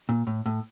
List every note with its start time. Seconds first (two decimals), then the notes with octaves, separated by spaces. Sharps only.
0.09 A#2
0.27 A2
0.46 A2